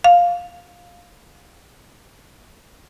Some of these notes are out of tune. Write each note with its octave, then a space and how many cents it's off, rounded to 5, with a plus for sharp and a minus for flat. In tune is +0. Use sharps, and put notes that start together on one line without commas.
F5 +5